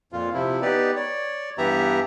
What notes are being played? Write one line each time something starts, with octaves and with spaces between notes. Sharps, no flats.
F2 A#2 F4
C3 F3 E4
B3 D#4 G4 B4 D5
C#5 D5
G2 E3 B3 G4 E5 A#5